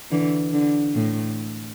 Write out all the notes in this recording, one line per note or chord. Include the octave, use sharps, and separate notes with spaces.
D3 E3
D3
A2